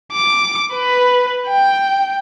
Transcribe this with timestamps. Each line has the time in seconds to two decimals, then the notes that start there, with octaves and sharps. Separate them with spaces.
0.13 D6
0.74 B4
1.48 G5